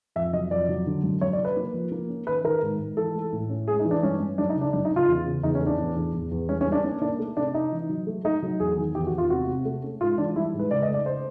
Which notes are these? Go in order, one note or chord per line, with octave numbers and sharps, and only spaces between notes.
F2 E5
F#3 D#5
F2 D5
F#3
D3
F#2
F#2 C#5
D5
F#3
B4
A#3
F3
A#3
C#4
D#3 B4
D#3 A#4
G#2
G#2
E3 A4
A3
A2
C#4
G#3 G#4
D#4
E3
D4
G2 C#4
G2
F#2 D4
D#4
C#3
D4
F#2 D4
D#4
C#3
F4
E2
C#3
E2 D#4
C#4
A3
D4
E2
E2
E2
E2
G3 C#4
C#4
G3
D4
A#3 C#4
A#3 D4
A3
C3 D4
C#4 D#4
E3
F#3
A3
A3 D#4
F#3
E2 G#4
D#3
E2 G4
F#4
E2
F4
C3 F#4
C3
A3
C#4
G#2 F4
E3 D4
G3 E4
G#2
B4
C#3 D5
D#5
A3
D5
C5